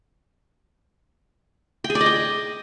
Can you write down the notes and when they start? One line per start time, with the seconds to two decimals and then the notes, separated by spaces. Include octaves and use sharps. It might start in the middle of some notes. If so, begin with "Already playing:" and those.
1.84 G5
1.90 G#4
1.95 D5
2.01 D#5
2.06 G5